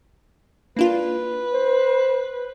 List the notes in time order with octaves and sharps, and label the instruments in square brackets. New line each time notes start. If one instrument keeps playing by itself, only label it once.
[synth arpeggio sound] A#3 D4 F4 [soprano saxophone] B4
[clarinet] C5